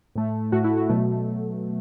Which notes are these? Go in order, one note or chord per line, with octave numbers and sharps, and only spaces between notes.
A2 A3
A2 A3 F#4
E4
F#4
B2 F#3 A3